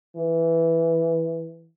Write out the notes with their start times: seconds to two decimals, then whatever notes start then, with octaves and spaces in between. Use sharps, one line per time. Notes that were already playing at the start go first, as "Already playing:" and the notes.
0.16 E3